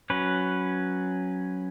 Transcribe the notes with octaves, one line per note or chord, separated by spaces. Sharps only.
F#3 C#4 B4